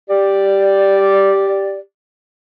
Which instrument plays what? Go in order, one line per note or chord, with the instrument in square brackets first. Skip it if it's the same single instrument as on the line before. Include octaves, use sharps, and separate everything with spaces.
[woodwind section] G4 D5